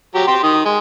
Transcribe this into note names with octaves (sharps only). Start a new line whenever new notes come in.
F#3 G4 A#5
G4 G5 C6
D#3 D#6
G#3